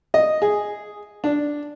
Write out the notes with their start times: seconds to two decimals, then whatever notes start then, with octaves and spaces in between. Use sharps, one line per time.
0.14 D#5
0.42 G#4
1.24 D4